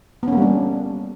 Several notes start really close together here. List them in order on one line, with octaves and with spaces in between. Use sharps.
B3 C#4 A#3 G3 D4